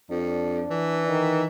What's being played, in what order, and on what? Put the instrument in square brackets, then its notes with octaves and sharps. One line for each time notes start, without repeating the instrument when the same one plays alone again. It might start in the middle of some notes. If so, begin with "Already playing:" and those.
[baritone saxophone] F2 [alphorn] D4
[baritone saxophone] E3
[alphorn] D#3